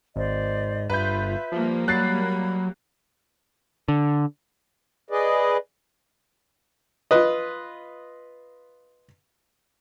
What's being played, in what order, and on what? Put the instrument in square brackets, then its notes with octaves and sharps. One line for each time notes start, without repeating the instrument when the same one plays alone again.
[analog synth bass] G#1 [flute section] C5 D5 D#5
[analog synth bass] G1 [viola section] F4 [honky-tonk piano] B4 G6 [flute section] E5
[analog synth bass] F3 [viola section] G3 A#3
[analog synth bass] F#3 [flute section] B5 G#6 [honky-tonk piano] F#6 A6 C7
[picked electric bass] D3
[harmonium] G#4 B4 D5 D#5
[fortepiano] F4 B4 D#5